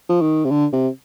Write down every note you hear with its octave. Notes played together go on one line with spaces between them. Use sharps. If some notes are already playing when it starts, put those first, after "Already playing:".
F3
D#3
C3
D3
C3